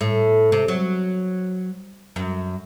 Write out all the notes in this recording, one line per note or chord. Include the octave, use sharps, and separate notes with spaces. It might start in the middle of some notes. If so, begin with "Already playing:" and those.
A2
C3
F#3
F#2